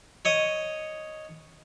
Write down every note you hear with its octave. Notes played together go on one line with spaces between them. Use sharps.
C#5 D#5 D#6